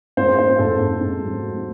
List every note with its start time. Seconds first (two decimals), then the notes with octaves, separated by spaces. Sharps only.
0.17 G#2 C5
0.38 G#2 C5
0.59 G#2 A4
0.80 G#2
1.01 G#2
1.23 F#3
1.43 A3